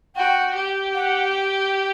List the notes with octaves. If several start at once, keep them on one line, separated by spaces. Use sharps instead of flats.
F#4 G5
G4
F#5